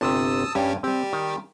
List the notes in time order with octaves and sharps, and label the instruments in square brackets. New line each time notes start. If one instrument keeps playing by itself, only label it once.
[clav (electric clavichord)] G1 C3 [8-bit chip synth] A5 D#6 E6
[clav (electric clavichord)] G2 [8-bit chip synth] G3 C#4 G4
[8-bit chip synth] G3 G4 [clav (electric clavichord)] C4
[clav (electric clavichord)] D#3